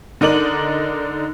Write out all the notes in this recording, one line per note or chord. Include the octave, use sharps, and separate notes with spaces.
D3 D#4 A#4 D5 D#7 F#7